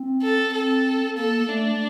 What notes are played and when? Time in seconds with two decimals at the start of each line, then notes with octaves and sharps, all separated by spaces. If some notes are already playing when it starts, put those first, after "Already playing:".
Already playing: C4
0.22 A4
0.53 C4 A4
1.17 A#3 A4
1.49 A3 D4